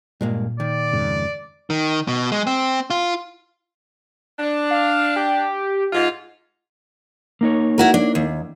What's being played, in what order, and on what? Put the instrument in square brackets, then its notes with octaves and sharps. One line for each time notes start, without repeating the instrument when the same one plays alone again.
[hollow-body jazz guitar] G2 G#3 A#3 [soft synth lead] A#2
[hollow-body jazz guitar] D#3 [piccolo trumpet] D5
[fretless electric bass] F2 G#2 C#3
[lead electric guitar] D#3
B2
G#3
C4
F4
[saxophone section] D4
[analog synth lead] F5
G4
[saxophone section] G#2 F4
[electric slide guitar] A#3 D#4 C#5
[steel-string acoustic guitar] E4 F#4 A#4
D4
D#2